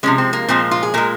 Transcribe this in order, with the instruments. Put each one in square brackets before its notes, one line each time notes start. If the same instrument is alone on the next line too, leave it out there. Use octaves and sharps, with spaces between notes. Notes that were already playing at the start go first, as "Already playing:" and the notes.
[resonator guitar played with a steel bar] C3 F3 G#3 C#4
C4
A#3
A#2 F3 G#3 C4
F4
G#4
A#2 G#3 A#4